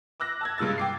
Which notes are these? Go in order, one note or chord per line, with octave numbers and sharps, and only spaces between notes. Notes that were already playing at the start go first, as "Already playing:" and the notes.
D6 E6 F#6 A#6
A5 E6 G#6
G2 C#3 G#3 E6 A6
G5 D6 C7